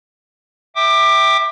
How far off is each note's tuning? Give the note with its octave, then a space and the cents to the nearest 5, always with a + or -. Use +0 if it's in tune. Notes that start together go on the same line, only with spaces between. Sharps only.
E5 -5 G5 +0 D6 +25